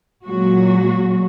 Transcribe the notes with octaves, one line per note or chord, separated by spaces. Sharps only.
A#2 F#3 G#3 F#4